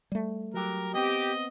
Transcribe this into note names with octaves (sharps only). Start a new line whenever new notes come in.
G3 A3
F#3 G4 A#4
B3 C4 G4 D#5